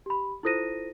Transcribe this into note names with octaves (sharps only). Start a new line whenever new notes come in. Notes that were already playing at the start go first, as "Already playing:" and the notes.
G4 B5
E4 F4 A4 C5 A#6 D#7